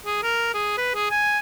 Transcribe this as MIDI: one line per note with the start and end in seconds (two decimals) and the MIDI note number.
0.06 0.21 68
0.23 0.49 70
0.54 0.76 68
0.78 0.94 71
0.95 1.08 68
1.10 1.39 80